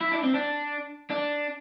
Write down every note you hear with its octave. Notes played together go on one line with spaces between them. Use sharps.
E4
D4
C4
D4
D4